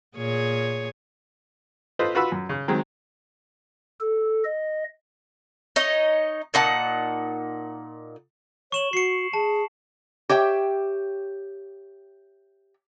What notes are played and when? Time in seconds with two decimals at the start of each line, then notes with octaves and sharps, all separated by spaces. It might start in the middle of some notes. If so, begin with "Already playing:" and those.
0.17 A#2 G#4 C#5
1.99 F4 A4 B4 C5 D#5
2.15 F4 F#4 B4 B5 E6
2.32 F#2
2.49 C#3
2.68 D#3 F#3 G#3 C4
4.00 A4
4.45 D#5
5.76 D#4 C#5 D#5
6.54 A#2 D#4 F#5 A5
8.72 C#5 C#6 E7 F#7
8.93 F#4 C7 C#7
9.33 G#4 A5
10.29 G4 C#5 E5 G5